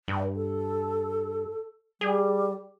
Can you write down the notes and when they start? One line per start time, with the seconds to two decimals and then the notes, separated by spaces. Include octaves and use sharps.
0.08 G2
0.36 A4
2.01 G3 G#4